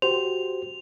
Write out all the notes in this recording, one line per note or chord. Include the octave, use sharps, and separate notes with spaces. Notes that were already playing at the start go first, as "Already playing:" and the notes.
F#4 G4 C5 F7